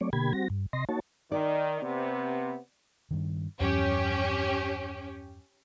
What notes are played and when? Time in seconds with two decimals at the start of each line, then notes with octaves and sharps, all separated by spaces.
0.01 F#3 A3 C4 C#5 D5
0.13 B2 D3 A#3 G4 B5 G#6
0.33 G3 C4 F#4 A#6
0.50 G2
0.73 C3 D#5 C6 A#6
0.89 A#3 D#4 F#4 C#5 A5
1.32 D#3 D5
1.82 C3 B3
3.11 G2 D#3
3.60 E2 G2 F3 C#4 G4